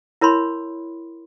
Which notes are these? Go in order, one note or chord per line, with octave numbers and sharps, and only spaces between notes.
E4 A#4 C#5 B5 C6